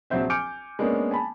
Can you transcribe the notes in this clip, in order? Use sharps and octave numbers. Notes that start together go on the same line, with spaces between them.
A#1 F#3 C4 C5 E5
G#5 D6 F6 G6 C#7 D7
G#3 A#3 B3 C#4 D4
G#5 A5 B5